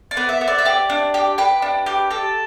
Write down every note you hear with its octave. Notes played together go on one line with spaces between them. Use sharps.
D5
B3
E5
B3
D5
E5
G4 D5
D4
G4
G4 B4
D4
G4
G4 A4